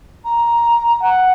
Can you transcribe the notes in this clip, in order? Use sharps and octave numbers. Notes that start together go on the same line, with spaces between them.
A#5
F#5